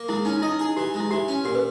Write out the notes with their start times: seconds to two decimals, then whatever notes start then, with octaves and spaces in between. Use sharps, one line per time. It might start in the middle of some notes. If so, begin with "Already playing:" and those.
Already playing: A#3
0.09 G#3 E4
0.25 C#4 D#4
0.42 E4 D#5
0.52 D#4
0.59 E4 G#4
0.76 E3 G4
0.94 G#3
1.00 E4
1.11 E3 G4
1.28 C#4
1.44 A#2 G4
1.55 B4